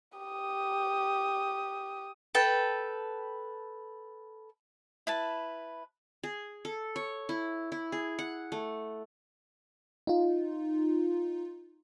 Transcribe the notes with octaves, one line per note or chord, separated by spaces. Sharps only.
G4 D#6
A4 B4 G5
E4 B4 A5
G#4
A4
C#5
E4
E4
G#4
F#5
A3
D#4 F4